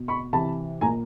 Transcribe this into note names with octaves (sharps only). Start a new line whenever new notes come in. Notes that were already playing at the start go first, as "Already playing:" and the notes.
Already playing: B2
B5 C#6
C3 E3 A5 B5
A#2 G#5 A#5